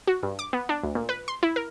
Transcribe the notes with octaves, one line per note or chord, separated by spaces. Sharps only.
F#4
G2
D6
B3
D4
D2
A#2
B4
C6
E4
A#4